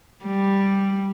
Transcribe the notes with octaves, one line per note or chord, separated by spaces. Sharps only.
G3